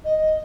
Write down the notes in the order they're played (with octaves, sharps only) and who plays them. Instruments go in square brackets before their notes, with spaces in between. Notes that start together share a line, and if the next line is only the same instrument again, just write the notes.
[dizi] D#5